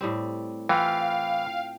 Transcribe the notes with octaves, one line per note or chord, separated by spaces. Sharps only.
A2 G3 C4
E3 C4 F4 B4 F5 G5